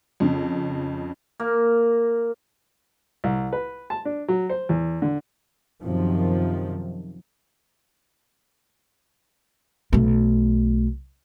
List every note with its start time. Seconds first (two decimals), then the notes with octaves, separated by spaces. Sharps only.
0.20 F2 C#3
1.40 A#3
3.24 C2
3.52 B4
3.90 A5
4.05 D4
4.28 F#3
4.49 C5
4.69 E2
5.02 D3
5.83 F#2 C3 D#3 F3
9.93 B1 A3